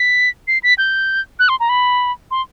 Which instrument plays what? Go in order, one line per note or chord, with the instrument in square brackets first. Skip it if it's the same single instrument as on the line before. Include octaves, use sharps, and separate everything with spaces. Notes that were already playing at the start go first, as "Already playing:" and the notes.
Already playing: [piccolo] B6
C7
B6
G6
F#6
C6
A#5
B5
C6